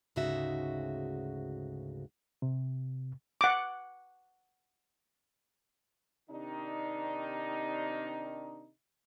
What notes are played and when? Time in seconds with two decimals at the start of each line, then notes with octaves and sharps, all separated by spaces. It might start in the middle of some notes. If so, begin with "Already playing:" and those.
0.16 D2 G#2 C#3 D#4 F#4 E5
2.42 C3
3.41 F#5 D6
6.30 C3 D#3 D4 D#4